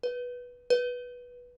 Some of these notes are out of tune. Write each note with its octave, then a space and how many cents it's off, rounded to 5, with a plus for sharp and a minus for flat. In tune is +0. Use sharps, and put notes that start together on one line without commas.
B4 -10
B4 -10